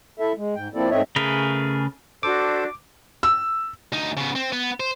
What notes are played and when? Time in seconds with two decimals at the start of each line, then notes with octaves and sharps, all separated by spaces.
0.19 E4 A4 E5
0.37 G#3
0.55 G#2 G5
0.74 F3 A#3 C4 E4 A4 D5
0.90 G#2 A3 C4 C#5 D#5 E5
1.16 C#3 A3 G#4 A#4 B4
2.23 D4 F#4 A4 C5 D6
3.23 E6
3.93 D2 D#4
4.17 C#3 B3
4.35 C4
4.52 B3
4.80 C5